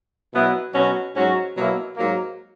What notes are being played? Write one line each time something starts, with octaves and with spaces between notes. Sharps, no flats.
B2 F#3 B3 E4
B2 F#3 C#4 F#4
G#2 F#3 C#4 F#4
B2 F#3 A#3 E4
G#2 F#3 A#3